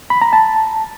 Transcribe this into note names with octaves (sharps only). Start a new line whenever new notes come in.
B5
A#5
A5